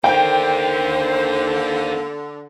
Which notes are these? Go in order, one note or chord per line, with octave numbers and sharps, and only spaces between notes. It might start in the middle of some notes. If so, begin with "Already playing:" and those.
D3 A#3 D#4 C5 G5